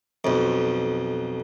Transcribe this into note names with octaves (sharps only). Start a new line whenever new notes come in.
B1 F2